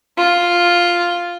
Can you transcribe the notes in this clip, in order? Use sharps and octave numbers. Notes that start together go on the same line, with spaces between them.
F4